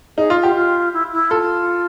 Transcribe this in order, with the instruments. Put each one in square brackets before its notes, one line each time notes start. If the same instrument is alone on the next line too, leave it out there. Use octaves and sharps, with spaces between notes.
[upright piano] D#4 [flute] G#4
[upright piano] F4
[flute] F4 [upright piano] G4
[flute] F4
E4
E4
[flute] F4 [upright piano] A4